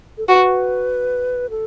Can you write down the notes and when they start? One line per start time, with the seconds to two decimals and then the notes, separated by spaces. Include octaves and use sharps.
0.18 A4
0.29 F#4 B4
1.50 A4